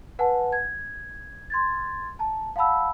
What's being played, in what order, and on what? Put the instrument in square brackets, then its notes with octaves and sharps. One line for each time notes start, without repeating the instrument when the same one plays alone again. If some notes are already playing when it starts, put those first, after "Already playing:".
[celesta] B4 F#5 G#5 A5
G#6
C6 G#6 A6
A5 A#5
F5 F#5 A5 B5 E6